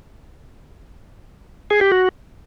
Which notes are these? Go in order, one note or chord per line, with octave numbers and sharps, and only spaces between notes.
G#4
G4
F#4